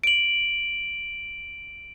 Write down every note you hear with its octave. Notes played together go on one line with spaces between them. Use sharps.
D7 F#7